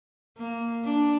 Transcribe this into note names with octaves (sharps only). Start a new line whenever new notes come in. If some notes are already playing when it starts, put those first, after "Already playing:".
A#3
D4